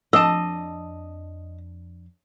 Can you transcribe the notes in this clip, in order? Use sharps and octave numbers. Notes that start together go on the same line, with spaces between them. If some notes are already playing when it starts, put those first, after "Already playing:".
F2 D4 D#5 A5 E6